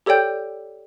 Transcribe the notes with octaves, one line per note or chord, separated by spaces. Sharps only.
G4 A4 C#5 D5 G5 G6